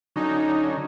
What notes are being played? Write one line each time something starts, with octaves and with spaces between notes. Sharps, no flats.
D3 F#3 C#4 D#4